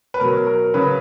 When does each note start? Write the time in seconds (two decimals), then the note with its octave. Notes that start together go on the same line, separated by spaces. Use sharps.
0.14 B4
0.20 B2 F#3 A#4
0.47 A#4
0.74 C#3 F#3 B4